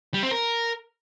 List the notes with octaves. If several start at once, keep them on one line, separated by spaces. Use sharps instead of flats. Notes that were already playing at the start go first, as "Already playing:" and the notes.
G3
C4
A#4